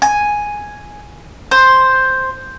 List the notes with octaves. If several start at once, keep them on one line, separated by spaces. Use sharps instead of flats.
G#5
C5